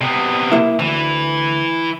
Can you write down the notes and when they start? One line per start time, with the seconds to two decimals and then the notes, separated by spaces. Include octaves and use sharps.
0.01 C3 B3
0.52 A#3 E4
0.79 D2 E3